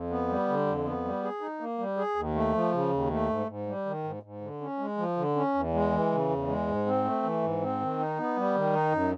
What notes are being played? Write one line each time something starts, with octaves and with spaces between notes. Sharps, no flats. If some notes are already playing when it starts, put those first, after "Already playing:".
Already playing: F2
B3
G3
D3
F2
B3
G3
G#4
D#4
A#3
G3
G#4
D#2
A3
F3
C#3
D#2
A3
G#2
G#2
G3
D#3
G#2
G#2
D3
C#4
G#3
F3
D3
C#4
E2
G#3
E3
C#3
E2
G#3
G#2
C4
A3
E3
G#2
C4
D#3
D#4
B3
G3
D#3
D#4
F#2